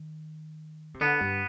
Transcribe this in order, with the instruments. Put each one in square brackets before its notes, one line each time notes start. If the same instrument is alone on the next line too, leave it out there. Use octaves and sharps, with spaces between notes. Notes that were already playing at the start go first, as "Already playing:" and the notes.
Already playing: [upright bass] D#3
C3
[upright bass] D3 [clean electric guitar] B3
[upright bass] G2